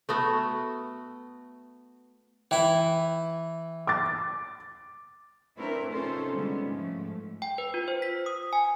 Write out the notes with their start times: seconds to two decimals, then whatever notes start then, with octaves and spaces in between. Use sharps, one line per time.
0.09 A3 B3 F#4
2.51 E3 E4 G5
3.87 D6 A6
5.57 A3 C4 D4 E4 A#4 B4
5.91 C3 C#4 D#4 F4 A4 C5
6.34 D3 G3 G#3 B3 C#4
6.67 G#2 F3 A3
7.42 G5
7.58 B4
7.74 F4
7.88 C5
8.02 B6
8.26 D#6
8.53 G#5